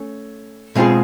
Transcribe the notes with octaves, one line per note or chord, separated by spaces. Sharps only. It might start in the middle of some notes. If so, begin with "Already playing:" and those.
Already playing: A3 C#4
B2 G#3 C4 F4 G#4